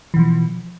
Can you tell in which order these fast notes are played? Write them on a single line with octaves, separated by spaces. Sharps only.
E3 B2 F3